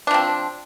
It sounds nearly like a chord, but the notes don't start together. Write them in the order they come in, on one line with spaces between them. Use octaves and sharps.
D4 F3 C4